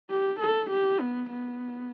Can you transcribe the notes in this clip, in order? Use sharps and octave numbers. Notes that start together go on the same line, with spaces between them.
G4
A4
G4
B3
B3